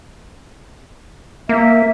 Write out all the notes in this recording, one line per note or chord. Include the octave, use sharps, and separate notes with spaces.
A#3 E5